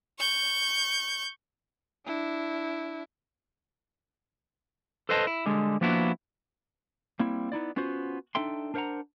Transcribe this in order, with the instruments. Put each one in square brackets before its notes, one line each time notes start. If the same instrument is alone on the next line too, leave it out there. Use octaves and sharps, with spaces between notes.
[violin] C#6 G6
[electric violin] D4 E4
[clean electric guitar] A4 B4 C5 D#5 G5 A5
E4
D3 G3 G#3
F3 A#3 B3 D4 E4 F#4
G3 A#3 C4 E4
B3 D#4 E4 D5
B3 C#4 F4 F#4 C5
D4 D#4 A4 E5 G5 C6
D4 A#4 C5 F5 F#5 A#5